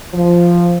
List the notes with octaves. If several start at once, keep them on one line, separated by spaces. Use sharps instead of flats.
F3